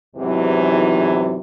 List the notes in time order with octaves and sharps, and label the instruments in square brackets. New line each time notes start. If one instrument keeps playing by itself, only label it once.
[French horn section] E2 G#2 C3 D#3 E3 F#3